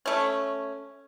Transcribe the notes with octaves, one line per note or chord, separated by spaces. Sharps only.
A3 C#4